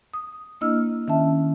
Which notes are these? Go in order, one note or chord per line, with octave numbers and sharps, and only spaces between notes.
D#6
A#3 D4 E4 D#5 E6 F6
D#3 C#4 E5 A5